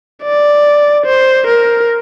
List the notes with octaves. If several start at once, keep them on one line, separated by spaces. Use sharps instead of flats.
D5
C5
A#4